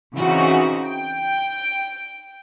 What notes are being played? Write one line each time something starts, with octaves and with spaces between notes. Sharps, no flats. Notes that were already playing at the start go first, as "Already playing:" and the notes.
C#3 E3 C4 D#4 F#4
G5